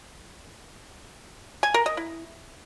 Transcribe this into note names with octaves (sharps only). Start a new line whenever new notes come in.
G#5
A#4
D#5
E4